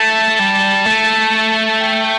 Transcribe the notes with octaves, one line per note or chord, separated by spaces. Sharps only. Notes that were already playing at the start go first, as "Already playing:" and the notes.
Already playing: A3 A5
G3
A3
G5